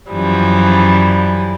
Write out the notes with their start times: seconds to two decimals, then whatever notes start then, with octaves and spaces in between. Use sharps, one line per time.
0.11 F#2 E3 F3 G3